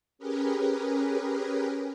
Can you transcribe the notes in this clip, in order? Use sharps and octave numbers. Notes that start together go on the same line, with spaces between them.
C#4 G4 G#4 A#4 B4